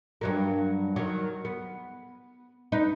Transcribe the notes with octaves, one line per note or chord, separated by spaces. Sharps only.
G2 F#3 A#3
D#3 F#3
B3
D#4 B4